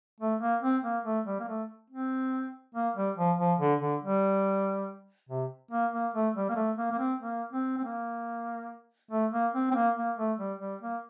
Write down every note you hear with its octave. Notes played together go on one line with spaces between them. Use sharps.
A3
A#3
C4
A#3
A3
G3
A#3
A3
C4
A#3
G3
F3
F3
D3
D3
G3
C3
A#3
A#3
A3
G3
A#3
A3
A#3
A#3
C4
A#3
C4
C4
A#3
A3
A#3
C4
C4
A#3
A#3
A3
G3
G3
A#3